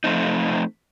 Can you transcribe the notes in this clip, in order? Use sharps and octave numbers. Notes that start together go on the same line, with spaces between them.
F3 A3 C4 D#4